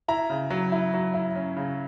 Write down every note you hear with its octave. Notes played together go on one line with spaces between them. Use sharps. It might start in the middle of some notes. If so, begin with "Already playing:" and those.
E4 A#5
C#3
F#3
E4
F#3
E4
C#4
C#3